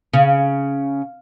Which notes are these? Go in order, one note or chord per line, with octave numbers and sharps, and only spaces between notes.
C#3